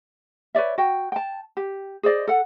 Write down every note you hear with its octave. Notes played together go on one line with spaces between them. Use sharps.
B4 C#5 D5 E5
F#4 G5
G5 A5
G4
G#4 C5 D5 D#5
A4 F#5